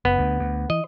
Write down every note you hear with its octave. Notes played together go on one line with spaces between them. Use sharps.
F#1 B3
D2
D2
E3 D#5